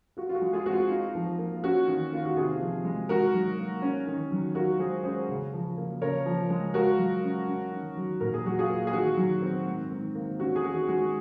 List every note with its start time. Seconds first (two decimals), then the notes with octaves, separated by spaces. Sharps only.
0.17 F4 F#4
0.29 F4
0.35 F#4
0.41 G#3
0.53 F4 G#4
0.66 C4 F#4
0.72 F4
0.90 D#4
1.15 F3
1.38 A#3
1.56 F4
1.64 C#4 F#4
1.88 D#3
2.13 A#3 F4
2.25 F#4
2.36 C3 F4 G#4
2.60 F3
2.85 G#3
3.09 D#4 F#4 A#4
3.34 F#3
3.58 A#3
3.82 C#4
4.07 D#3
4.32 F#3
4.55 F4 F#4 A#4
4.79 G#3 G#4 C5
5.03 C#4 G#4 C5
5.29 C#3
5.53 F3
5.77 A#3
6.02 C#3 A#4 C#5
6.26 F3
6.50 G#3
6.74 F4 F#4 A#4
6.98 F#3
7.23 C#4
7.47 C#4
7.71 D#3
7.97 F#3
8.21 A#2 A#4
8.34 G#4
8.45 F#3 F#4
8.59 F4 G#4
8.69 A#3
8.87 G#4
8.93 D#3 F#4
9.17 F#3
9.42 C4
9.67 G#2
9.91 D#3
10.15 A#3
10.40 C#4 F#4
10.56 G#4
10.64 D#3 F#4
10.88 G#3 F#4